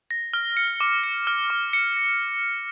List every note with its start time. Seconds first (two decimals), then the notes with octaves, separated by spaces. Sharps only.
0.11 A#6
0.34 F6
0.57 C#7
0.81 D6
1.03 C#7
1.27 F6
1.50 D6
1.73 C#7
1.96 A#6